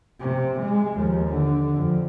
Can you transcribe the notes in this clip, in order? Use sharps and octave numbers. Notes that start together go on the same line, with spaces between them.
C3
G#3
D#2 F3
D3
F2